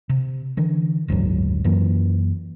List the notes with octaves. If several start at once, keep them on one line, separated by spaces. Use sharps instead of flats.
C3
D3 E3
F#1 D2 G#2 F#3
F#2 E3 A#3